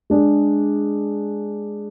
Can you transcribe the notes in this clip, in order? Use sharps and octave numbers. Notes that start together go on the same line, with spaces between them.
G#3 D4 G#4